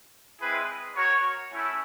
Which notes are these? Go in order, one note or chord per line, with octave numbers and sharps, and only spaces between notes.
G#3 C4 E4 G#4 B4
F#4 A#4 C#5
A3 C#4 E4